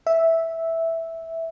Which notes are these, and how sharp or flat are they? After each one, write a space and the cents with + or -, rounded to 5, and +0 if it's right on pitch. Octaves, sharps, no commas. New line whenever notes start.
E5 -5